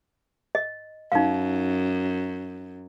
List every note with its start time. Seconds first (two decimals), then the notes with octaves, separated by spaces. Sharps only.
0.55 D#5
1.12 F#2 D#4 F5